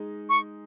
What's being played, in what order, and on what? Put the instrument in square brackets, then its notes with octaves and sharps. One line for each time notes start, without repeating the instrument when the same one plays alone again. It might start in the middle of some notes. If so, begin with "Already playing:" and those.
Already playing: [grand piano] G#3 D#4 G#4
[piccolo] C#6